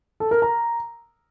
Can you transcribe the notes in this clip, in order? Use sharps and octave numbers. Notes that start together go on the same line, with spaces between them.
A4
A#4
A#5